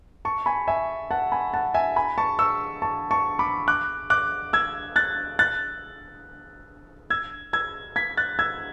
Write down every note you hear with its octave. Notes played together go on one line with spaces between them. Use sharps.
A5 C#6
G#5 B5
E5 G#5
F#5 A5
G#5 B5
F#5 A5
E5 G#5
G#5 B5
A5 C#6
C#6 E6
A5 C#6
A5 C#6
B5 D6
D6 F#6
D6 F#6
E6 G#6
F#6 A6
F#6 A6
E6 G#6
E6 G#6
G#6 B6
F#6 A6
E6 G#6